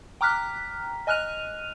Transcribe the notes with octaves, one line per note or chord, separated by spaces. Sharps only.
G5 A#5 D6 F6 F#6 B6
D#5 G#5 F6 F#6 D#7 F7